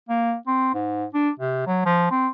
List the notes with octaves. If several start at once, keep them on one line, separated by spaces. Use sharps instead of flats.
A#3
C4
G#2
D4
C3
F#3
F3
C4